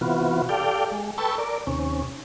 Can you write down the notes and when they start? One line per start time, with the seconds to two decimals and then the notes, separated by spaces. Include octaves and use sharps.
0.01 C3 E3 B3 F4 F#4
0.49 G4 A4 D5 F5 G5
0.92 G#3
1.18 A4 B4 G5 A5 C#6 E6
1.38 A#4 D5
1.67 D#2 C3 C#4